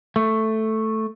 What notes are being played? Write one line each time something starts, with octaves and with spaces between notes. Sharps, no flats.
A3